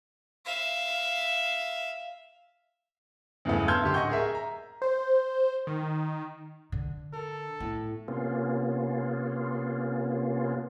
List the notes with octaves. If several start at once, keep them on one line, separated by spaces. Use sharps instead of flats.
E5 F5
E2 G2 C#3 E3 A3 B3
A5 C6 E6 F6 G6 G#6
F#2 D3 G4 C6
D1 D#5 F#5 C#6 G6
G#4 A#4 E5
A#5
C5
D#3
D3
A4 A#4
A2 B3
C3 A#3 B3 C#4 F4